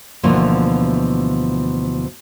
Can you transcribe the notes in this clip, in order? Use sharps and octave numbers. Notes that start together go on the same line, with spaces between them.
D2 B2 E3 F3 A#3